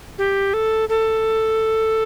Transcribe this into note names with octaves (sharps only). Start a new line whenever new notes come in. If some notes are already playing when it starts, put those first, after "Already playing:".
G4
A4
A4